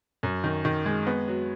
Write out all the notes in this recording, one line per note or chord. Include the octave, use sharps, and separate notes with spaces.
F#2
D#3
D#3
G#3
B3
F#3